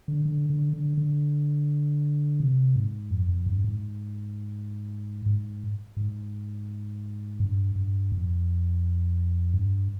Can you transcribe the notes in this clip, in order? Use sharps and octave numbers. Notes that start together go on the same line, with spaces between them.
D3
D3
D3
D3
D3
C3
G#2
F2
F2
G2
G#2
G#2
G#2
G2
G2
F2
G2